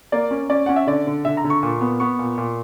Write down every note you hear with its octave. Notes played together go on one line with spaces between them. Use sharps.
A#3 D5
C#4
C#4 D5
C#4 F#5
E5
D3 D5
D3
D3 E5
A#5
D3
C#6
A#2
B3
B3 C#6
A#2
A#2